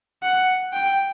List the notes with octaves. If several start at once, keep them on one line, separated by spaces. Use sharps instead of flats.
F#5
G5